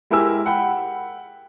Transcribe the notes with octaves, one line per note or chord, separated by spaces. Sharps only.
G#3 E4 G4 A#4 G#5 E6
F#5 G5 B5